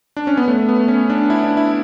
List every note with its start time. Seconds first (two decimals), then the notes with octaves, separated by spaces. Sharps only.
0.17 D4
0.27 C#4
0.37 B3
0.48 A3
0.69 B3
0.88 C#4
1.10 D4
1.30 E4
1.43 D4
1.57 E4